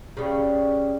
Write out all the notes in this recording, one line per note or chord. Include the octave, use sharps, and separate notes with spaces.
C#3 G3